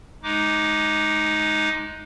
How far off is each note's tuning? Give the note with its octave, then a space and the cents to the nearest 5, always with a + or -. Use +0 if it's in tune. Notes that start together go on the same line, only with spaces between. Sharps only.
G#3 +15 D#4 +0 D6 +0